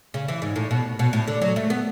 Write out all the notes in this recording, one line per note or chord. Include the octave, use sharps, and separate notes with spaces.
C#3
E3
G#2
A2
B2
B2
A2
D3
F#3
A3
B3